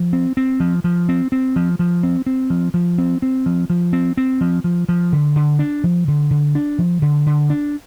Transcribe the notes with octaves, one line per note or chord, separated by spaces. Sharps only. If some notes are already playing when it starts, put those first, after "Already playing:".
Already playing: F3
C4
C4
F3
F3
C4
C4
F3
F3
C4
C4
F3
F3
C4
C4
F3
F3
C4
C4
F3
F3
F3
D3
D3
D4
F3
D3
D3
D4
F3
D3
D3
D4